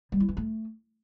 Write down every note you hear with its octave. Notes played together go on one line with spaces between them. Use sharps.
G3
E4
E3
A3